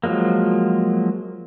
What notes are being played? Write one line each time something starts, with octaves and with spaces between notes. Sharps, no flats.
F3 F#3 G#3 A#3